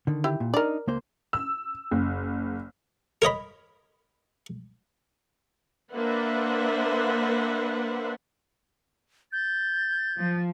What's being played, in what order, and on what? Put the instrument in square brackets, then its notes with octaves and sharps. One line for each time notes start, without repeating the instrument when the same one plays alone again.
[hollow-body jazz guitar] D3 D#3
[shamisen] E4 G4
[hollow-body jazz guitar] A#2
[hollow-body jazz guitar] D4 D#4 [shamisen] A#4 D5
[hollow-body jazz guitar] C#2 A#3 C5
[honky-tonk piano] E6
F#1
[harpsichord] A#4 C#5 D#5 B5
[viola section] A#3 D4 B4 C5 E5 F#5
[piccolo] G6 [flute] A6
[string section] F3